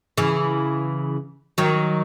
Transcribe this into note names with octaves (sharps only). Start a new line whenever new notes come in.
C#3 E3
D#3 F#3